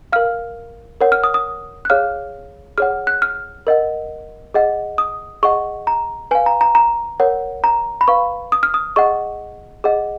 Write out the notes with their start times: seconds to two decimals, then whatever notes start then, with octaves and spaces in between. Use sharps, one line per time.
0.12 A#4 F5 F6
1.01 A#4 C#5 F#5
1.12 F6
1.24 D#6
1.34 D#6
1.85 F#6
1.90 G#4 C#5 F5 F6
2.78 G#4 C#5 F#5 F6
3.07 F#6
3.22 F6
3.67 A#4 D#5 F#5
4.54 G#4 D#5 F#5
4.98 D#6
5.43 G#4 D#5 F#5 C#6
5.87 A#5
6.31 B4 G#5
6.35 F5
6.46 A#5
6.61 A#5
6.75 A#5
7.20 A#4 C#5 F#5
7.64 A#5
8.01 B5
8.08 B4 F5 C#6
8.52 D#6
8.63 F6
8.74 D#6
8.96 G#4 D#5 F#5 C#6
9.84 G#4 D#5 F#5